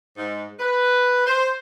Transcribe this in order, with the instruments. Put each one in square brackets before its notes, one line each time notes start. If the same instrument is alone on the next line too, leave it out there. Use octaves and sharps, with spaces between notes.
[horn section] G#2
B4
C5